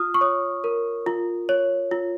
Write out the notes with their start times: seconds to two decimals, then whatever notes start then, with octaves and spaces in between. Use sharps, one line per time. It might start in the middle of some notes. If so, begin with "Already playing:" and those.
Already playing: F4 D#6 F6
0.14 C#6
0.21 C#5 D#6
0.64 A#4
1.06 F4
1.49 C#5
1.91 F4